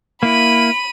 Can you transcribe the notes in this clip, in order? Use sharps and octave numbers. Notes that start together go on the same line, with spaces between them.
A#3 E4 B5 D#7